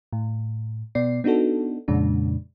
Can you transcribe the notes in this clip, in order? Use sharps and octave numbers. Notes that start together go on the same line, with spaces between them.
A2
B2 B3 D5 C7
B3 D4 D#4 F#4 A4
F2 A#2 C#3 G#3 D4